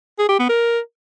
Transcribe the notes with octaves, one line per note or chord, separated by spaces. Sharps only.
G#4
G4
B3
A#4